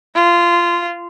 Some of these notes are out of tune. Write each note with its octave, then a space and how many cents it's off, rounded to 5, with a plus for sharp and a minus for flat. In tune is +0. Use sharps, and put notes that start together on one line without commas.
F4 -15